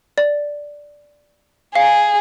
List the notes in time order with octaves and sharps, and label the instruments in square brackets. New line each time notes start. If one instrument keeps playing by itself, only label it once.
[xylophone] D5
[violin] G#4 [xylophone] F5